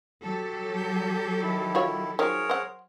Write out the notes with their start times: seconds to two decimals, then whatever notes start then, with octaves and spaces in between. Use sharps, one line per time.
0.22 F#3 G4 A4
0.77 G6
1.43 D#3 E4
1.75 F4 F#4 C#5
2.19 D#3 F3 F#3 G#4 A#4 C#5
2.50 C5 F#5